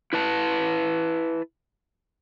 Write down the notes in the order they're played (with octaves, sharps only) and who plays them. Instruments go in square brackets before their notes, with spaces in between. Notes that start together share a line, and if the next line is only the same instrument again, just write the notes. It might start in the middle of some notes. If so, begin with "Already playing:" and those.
[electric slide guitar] E4 B4 A5